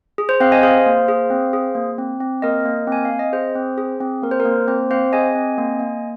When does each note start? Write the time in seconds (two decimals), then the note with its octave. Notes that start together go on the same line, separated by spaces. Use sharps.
0.18 G#4
0.29 C5
0.40 C4 C5 F5
0.52 D#5 G#5
0.63 G#4 C5 F5
0.86 A#3
1.08 G#4
1.30 C4
1.53 G#4
1.75 A#3
1.98 C4
2.20 C4
2.42 A#3 A#4 D#5
2.65 A#3
2.87 C4 G#5
3.05 F5
3.10 C4
3.19 D#5
3.33 G#4 C5
3.55 C4
3.78 G#4
4.01 C4
4.22 A#3 A#4
4.31 C5
4.40 A#4
4.45 A#3
4.68 C4 C5
4.91 C4 C5 F5
5.13 G#4 D#5 G#5
5.35 C4
5.58 A#3
5.80 A#3